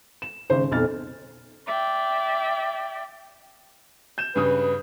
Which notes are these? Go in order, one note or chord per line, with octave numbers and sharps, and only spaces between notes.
E7
G#1 C#3 C5
B1 F2 A4 F6 A6
D5 E5 G5
G6 E7
G2 C#3 B4 D#6